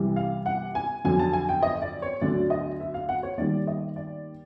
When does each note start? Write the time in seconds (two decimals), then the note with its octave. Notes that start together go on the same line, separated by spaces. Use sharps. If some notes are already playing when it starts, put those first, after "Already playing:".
Already playing: C2 C3 E3 G3
0.16 F5
0.46 F#5
0.75 G#5
1.04 F2 D3 F#3 G#5
1.19 A5
1.33 G#5
1.49 G5
1.63 D#5
1.82 D5
2.02 C#5
2.21 D2 D3 F#3 D5
2.50 D#5
2.80 E5
2.94 F5
3.09 F#5
3.23 C#5
3.37 D#2 D#3 G3 D5
3.67 D#5
3.96 D5